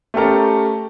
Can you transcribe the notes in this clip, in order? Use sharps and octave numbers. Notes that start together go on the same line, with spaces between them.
A3 C#4 G4 A4 A#4